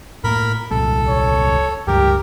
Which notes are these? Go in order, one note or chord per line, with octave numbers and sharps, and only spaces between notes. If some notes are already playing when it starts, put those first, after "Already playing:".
A2 A3 A#3 A#4 B5
D#1 C2 A#2 A4
C#5
C#2 G2 G4 A#4